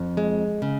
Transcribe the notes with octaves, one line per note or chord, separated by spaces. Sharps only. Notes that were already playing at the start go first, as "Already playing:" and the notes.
Already playing: F2
G#3
C#3